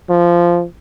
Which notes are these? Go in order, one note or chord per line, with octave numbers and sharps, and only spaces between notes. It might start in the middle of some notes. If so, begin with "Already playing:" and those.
F3